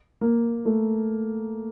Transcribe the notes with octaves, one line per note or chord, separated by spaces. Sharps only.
A#3
A3